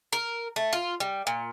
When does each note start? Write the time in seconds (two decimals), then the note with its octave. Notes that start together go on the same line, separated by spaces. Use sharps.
0.12 A#4
0.56 A3
0.73 F4
1.00 G3
1.27 A#2